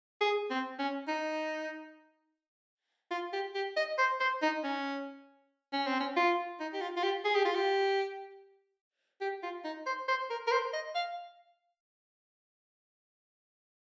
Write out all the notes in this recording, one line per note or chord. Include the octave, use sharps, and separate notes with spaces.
G#4
C4
C#4
D#4
F4
G4
G4
D#5
C5
C5
D#4
C#4
C#4
C4
C#4
F4
D#4
G4
F4
F4
G4
G#4
G4
F4
G4
G4
F4
D#4
C5
C5
A#4
A#4
C5
D#5
F5